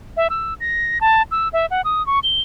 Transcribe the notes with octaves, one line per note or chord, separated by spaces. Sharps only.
E5
E6
A#6
A5
E6
E5
F#5
D#6
C#6
G7